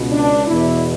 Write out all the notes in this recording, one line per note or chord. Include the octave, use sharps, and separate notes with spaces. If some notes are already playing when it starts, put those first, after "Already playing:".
Already playing: C#2 B2
D4
E2 B2 E4